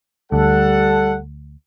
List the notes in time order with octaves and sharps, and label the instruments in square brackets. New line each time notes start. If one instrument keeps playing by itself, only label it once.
[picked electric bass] D2 [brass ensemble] G3 A4 F#5